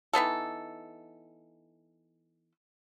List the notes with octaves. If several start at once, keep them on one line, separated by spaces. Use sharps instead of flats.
E3 B3 D#4 A4